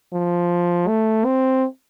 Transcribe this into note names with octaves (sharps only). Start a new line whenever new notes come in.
F3
A3
C4